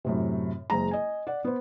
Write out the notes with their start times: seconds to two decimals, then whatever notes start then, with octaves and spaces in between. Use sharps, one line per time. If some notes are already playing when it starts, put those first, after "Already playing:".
0.05 F#2 A2 C3
0.70 F#1 G#3 A#5
0.91 D#5 G#5
1.27 D5 F#5
1.44 B3 C5